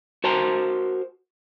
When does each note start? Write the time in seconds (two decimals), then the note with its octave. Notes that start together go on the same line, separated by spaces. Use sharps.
0.24 F#4 A#4 C5 A5 A#5 C6